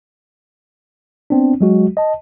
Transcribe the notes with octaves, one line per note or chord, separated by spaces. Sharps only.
B3 C4 D4
F#3 G#3 F#4
D#5 A5